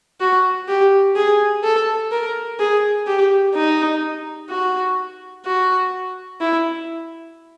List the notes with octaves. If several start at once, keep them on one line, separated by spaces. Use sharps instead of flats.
F#4
G4
G#4
A4
A#4
G#4
G4
D#4
F#4
F#4
E4